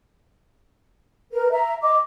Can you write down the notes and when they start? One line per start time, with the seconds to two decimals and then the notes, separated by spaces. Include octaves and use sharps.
1.33 A#4 B4
1.52 E5 A#5
1.82 D#5 D6